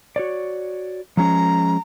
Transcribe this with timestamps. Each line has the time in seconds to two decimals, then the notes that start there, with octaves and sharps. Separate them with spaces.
0.16 F#4 C#5 D5
1.17 F3 G#3 C#4 A#5